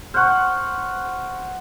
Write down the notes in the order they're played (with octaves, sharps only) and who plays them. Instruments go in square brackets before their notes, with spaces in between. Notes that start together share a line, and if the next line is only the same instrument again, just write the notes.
[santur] C5 F#5 [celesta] C#6 F6